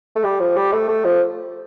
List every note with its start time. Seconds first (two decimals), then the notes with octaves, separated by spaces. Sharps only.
0.16 A3
0.24 G3
0.40 F3
0.56 G3
0.72 A3
0.88 A3
1.04 F3